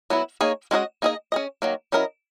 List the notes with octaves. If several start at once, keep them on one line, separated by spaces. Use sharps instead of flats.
F#3 B3 E4
A#3 D#4 G#4 C#5
G#3 C#4 F#4 B4 D#5
A#3 D#4 G#4 D#5
C#4 G#4 D#5
D#3 F#3 A#3
F#3 C#4 E4 A#4 D#5